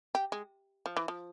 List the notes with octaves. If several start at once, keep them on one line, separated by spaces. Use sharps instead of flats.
G4
G#3
F3
E3
F3